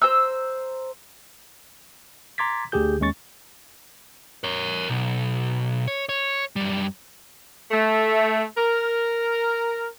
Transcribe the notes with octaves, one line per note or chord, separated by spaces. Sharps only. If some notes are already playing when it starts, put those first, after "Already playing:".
C5 A#5 E6
A#5 C6 D6 G#6 A6 B6
D2 D3 G4 G#4 G6
D#2 G#3 C#4 C#6 A6
A#4 C#5
B1
C#5
C#5
F#2 G3
A3
A#4